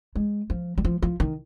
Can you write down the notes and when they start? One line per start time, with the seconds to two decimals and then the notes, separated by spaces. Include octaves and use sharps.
0.15 G#3
0.50 F3
0.78 G3
0.85 F3
1.02 F3
1.20 D#3